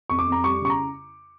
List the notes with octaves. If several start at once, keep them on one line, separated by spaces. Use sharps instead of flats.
F2 C#6
D6
F2
A#5
G3 C#6
C#3 C#6
A#5